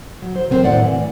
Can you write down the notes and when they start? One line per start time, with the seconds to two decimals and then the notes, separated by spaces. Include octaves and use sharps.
0.22 F#3
0.36 C5
0.50 D#3 F#3 B3 C4 A#4 C5
0.64 A2 D5 F#5
0.85 E3